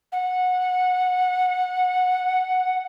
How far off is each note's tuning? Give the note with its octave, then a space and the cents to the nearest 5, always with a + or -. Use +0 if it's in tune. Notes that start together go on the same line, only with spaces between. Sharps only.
F#5 -15